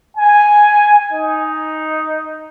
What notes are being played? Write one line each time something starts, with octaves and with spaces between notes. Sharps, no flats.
G#5
D#4